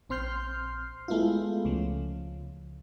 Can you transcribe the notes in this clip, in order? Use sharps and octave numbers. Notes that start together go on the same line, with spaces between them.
A#1 C4 C6 F6 G6 C7
G#3 A3 B3 E4 F4
C#2 C#3 F3